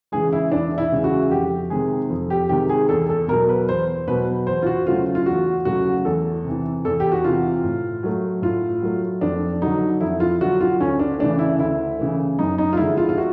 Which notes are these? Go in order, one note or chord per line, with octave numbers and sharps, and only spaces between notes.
C#3 E3 G#3 G#4
E4
E2 D4
E4
C#3 E3 G#3
F#4
F2 G4
C3 D#3 G#3 G#4
F2
G4
C3 D#3 G#3 G4
G#4
E2 A4
A4
B2 F#3 A#4
B4
E2 C5
B2 F#3 B4
E2 C5
F4
F#4
C#3 F#3 A3 F4
F4
E2 F#4
C#3 F#3 A3 F#4
E2 A4
C3
E3
E2 A4
G4
F#4
C3 E3 F4
A2
F#3 A3
A2 F4
F#3 A3
F2 D4
D3 F#3 D#4
F2 E4
F4
D3 F#3 F#4
F4
D2 C#4
D4
C#3 E3 A3 D4
E4
D2 E4
C#3 E3 A3
F#2 D#4
D#4
F4
D3 F3 G#3 E4
F4
F4
F#4